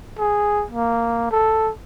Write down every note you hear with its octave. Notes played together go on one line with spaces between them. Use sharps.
G#4
A#3
A4